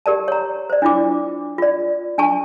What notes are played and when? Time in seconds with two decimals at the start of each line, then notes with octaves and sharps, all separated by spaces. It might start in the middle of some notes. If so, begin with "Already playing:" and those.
0.06 G4 A#4 D5 A5
0.28 C#5 A#5
0.70 C5 D5
0.82 D4 E4 F4 D6
1.58 F4 D5
2.18 D4 G#5 A5 C#6